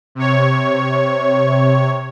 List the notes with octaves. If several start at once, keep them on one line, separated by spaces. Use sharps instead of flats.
C3 C#5